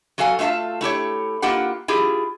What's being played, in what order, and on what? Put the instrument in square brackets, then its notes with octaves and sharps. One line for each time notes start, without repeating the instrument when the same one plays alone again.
[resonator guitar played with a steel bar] F#3 F#4 A4 F5 G#5
A3 F4 E5 F5 A5
A3 E4 G4 C#5
A#3 E4 F4 G4 F#5
E4 F4 G4 G#4